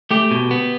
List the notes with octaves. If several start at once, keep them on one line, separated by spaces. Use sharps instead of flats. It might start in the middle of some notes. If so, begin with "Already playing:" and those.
A3 G4
B2
B3